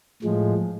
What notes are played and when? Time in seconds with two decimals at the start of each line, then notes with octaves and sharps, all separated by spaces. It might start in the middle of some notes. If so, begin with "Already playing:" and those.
0.23 A2 F3 G#3